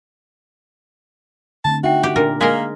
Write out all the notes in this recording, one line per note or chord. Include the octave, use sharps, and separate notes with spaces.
D3 A3 C4 A5
D#4 F#4 E5 G5
G4
A#2 D4 A#4
G#3 A#3 A#4 B6 C7